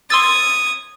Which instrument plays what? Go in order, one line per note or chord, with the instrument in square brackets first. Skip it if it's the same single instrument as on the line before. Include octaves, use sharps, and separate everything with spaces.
[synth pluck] C6 E6 A6 [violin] D#6 G#6